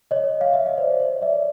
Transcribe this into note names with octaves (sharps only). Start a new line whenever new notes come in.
C#5 D#5
F5
E5
D#5
C5 D5
C#5 D#5
D5 E5